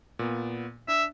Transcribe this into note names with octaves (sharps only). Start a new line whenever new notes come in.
A#2 B3
D4 E5